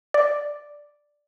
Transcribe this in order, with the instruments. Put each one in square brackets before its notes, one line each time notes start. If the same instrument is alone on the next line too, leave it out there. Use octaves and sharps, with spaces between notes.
[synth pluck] D5